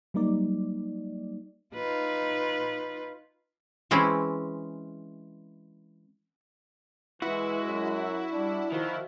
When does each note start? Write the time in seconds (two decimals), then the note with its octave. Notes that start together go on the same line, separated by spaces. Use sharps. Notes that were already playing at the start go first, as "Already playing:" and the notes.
0.14 F#3 G3 A#3 D#4 D5
1.74 D#4 F4 B4
3.91 E3 G#3 C4 C#4 E4
7.22 E3 G#3 E4 F#4
7.67 F#2
8.33 G3 D4
8.72 D#3 F3 F#4